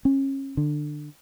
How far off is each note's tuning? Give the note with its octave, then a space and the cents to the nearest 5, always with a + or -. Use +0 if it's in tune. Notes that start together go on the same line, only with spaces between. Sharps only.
C#4 -30
D3 +20